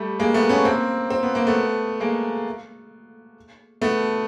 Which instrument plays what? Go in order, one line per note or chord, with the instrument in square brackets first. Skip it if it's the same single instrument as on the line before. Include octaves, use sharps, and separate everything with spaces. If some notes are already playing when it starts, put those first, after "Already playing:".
Already playing: [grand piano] G3 A3
G#3 A#3
A3 B3
B3 C#4
A#3 C4
C4
B3
A#3
A3 B3
G#3 A#3
A3 B3